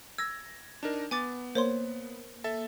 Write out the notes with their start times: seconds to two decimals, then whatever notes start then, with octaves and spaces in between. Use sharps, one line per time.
0.18 E6 G#6 A#6
0.83 D4 D#4 A#4
1.11 B3 G#5 D6 A6
1.55 A#3 C5 C#5 C6
2.44 A4 E5 A6